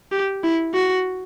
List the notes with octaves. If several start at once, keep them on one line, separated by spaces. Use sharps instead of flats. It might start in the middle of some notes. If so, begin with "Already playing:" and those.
G4
E4
F#4